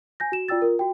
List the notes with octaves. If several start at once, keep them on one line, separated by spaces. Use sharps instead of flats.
G#5 G6 A#6
F#4 E7
F4 D5 G5 E6 A6
F4 A#4
F#4 G5